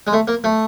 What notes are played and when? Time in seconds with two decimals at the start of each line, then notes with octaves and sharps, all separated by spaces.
0.07 G#3
0.13 A3
0.28 A#3
0.44 A3